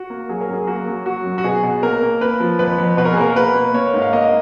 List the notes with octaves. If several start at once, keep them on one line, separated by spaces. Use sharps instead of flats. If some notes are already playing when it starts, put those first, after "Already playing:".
Already playing: F#4
A#3
F#3 G#4
A#4
F#2 G#4
A#3 F#4
F#3
F#3 F#4
F#2
F#4
B2 G#4
B2
A#3 A#4
A#3
A#3 B4
F3
F2 B4
F2
B2 B4
A#4
G#4
A#3 A#4
B2 B4
A#3
A#3 C#5
G#2
F5
A#3 D#5